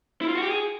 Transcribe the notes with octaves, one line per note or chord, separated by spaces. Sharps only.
E4
F4
F#4
G4
G#4